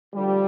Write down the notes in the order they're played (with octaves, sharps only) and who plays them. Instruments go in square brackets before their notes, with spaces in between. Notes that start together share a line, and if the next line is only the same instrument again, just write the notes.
[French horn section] D2 D3 F3 G3